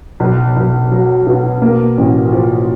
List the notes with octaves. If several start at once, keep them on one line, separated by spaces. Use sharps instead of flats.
B1
B1
F#3
B2
A#3
A1
F3